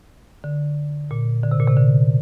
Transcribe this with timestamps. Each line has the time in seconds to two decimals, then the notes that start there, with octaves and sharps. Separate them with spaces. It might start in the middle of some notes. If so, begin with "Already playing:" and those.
0.44 D3
1.11 A#2
1.43 D3
1.51 C3
1.60 A#2
1.67 C3
1.77 D3